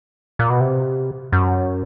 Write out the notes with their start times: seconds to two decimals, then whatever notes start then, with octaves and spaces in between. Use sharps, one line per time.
0.39 A#2
0.50 B2
0.60 C3
1.32 F#2